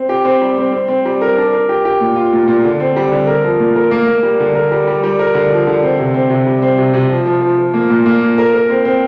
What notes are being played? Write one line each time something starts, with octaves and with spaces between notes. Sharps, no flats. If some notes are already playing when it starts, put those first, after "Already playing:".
Already playing: C4
G4
C4
G3
C4
C4
C4
G3
A#4
D4
A#4
G4
G4
A#2
F4
A#2
A#2
D3
C4
G3
D3
A#4
F3
A#2
A#4
A#3
A#3
G3
D3
A#4
G3
G3
G3
A#4
D3
F3
D3
C4
C3
C4
C3
G3
C4
C3
C3
F3
F3
F3
F3
A#3
A#2
A#3
A#2
A#4
A#4
C4
C4